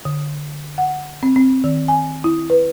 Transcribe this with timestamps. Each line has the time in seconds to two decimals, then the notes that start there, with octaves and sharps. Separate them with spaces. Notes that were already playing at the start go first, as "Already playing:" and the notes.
0.05 D3
0.78 F#5
1.23 C4
1.36 C4
1.64 D#3
1.88 G#5
2.24 E4
2.50 B4